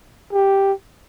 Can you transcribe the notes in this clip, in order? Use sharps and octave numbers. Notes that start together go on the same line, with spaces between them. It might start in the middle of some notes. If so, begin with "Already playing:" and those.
G4